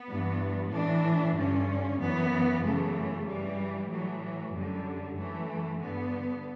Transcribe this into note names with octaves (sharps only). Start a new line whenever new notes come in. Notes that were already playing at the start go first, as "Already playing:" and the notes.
Already playing: B3
G2 E3
A2 E3 D4
G2 D3 C#4
F#2 E3 B3
F#2 C#3 E3 A3
G2 E3 G3
A2 E3 F#3
F#3
F#2 D3 G3
F#2 E3 A3
G2 D3 B3